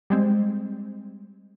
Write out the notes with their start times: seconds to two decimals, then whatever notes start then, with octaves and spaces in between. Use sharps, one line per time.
0.10 G3 G#3 C4